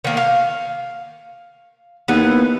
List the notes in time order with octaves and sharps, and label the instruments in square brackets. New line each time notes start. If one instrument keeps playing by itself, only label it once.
[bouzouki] D#3 A#3
F5
[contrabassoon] D#2 [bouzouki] E3 B3